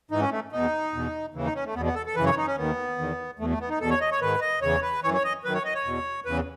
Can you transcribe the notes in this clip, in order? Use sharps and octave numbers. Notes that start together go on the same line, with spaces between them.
G#2 E3 D#4
C#4
A3
E2 B2 D#4
E2 B2
D#2 C#3 E3
D#4
C#4
A3
E2 B2 B3
B3
A4
A4
F#2 C#3 E3 B4
C#5
D#4
C#4
D#2 D#3 B3
E2 D#3
E2 B2 A3
A3
B3
D#4
E2 B2 A4
C#5
D#5
C#5
G#2 D#3 B4
D#5
E2 C#3 E3 C#5
B4
F#2 E3 C#5
C#5
D#5
F#2 D#3 B4
C#5
D#5
C#5
E2 B2
E2 C#3 E3 B4